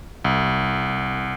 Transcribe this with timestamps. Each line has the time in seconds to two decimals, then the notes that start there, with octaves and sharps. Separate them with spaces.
0.25 C2